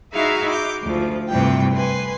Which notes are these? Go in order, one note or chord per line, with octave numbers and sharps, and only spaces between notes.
D#4 E4 F#4 G#4 E5 F5
D6 G6
D2 F3
D2 G2 C3 E3 G3 G5
B4 G#5 C6